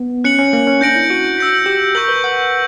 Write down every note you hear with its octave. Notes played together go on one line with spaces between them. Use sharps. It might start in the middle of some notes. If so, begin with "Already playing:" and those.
Already playing: B3
C#4 F#6 C#7 F#7
C#4
A#3
C#4
D4 G6 A#6 D7 F#7
E4
F#4
E6 G6 B6
G4
A#4 C#6 G6 B6 F#7
B4
F#5